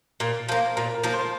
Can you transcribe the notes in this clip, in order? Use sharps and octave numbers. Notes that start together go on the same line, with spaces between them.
A#2 A#4
F3 A#3 C5
A#2 A#4
A#4
F3 A#3
C5